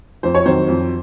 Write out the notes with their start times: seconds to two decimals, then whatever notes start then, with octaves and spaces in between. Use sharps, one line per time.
0.23 F2 C5
0.35 C#5
0.46 D#3 F#3 C4 C5
0.68 F2